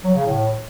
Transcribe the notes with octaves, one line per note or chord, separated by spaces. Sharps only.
F#3
C#3
A2